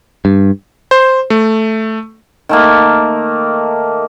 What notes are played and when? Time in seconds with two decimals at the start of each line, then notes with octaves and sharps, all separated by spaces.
0.25 G2
0.91 C5
1.30 A3
2.49 D#3 A3 A#3